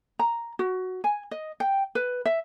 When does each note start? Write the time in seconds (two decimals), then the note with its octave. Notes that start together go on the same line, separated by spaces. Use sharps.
0.19 A#5
0.59 F#4
1.04 G#5
1.31 D#5
1.60 G5
1.95 B4
2.26 E5